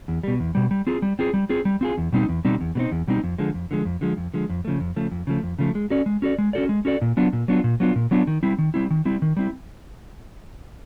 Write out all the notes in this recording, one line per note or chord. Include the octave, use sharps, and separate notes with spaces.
E2
B2 G3
E2
B2 G3
G3
C4 F4 G#4
G3
C4 F4 G#4
G3
C4 F4 G#4
G3
C4 F4 G#4
E2
B2 G3 C4 D#4
E2
B2 G3 C4 D#4
E2
B2 G3 C4 D#4
E2
B2 G3 C4 D#4
F2
D3 F3 G#3
F2
D3 F3 G#3
F2
D3 F3 G#3
F2
D3 F3 G#3
F2
C#3 F3 A3
F2
C#3 F3 A3
F2
C#3 F3 A3
F2
C#3 F3 A3
G#3
C#4 F#4 A4 D5
G#3
C#4 F#4 A4 D5
G#3
C#4 F#4 A4 D5
G#3
C#4 F#4 A4 D5
A#2
F#3 B3 D4 F4
A#2
F#3 B3 D4 F4
A#2
F#3 B3 D4 F4
A#2
F#3 B3 D4 F4
D#3
G3 C4 E4
D#3
G3 C4 E4
D#3
G3 C4 E4
D#3
G3 C4 E4